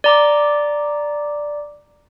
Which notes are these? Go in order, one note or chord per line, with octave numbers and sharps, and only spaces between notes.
D5 A#5 D6